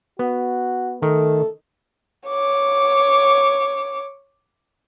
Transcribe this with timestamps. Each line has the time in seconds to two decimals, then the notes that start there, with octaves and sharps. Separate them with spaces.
0.19 B3 F#4
1.02 D#3 A3 A4
2.28 C#5 D6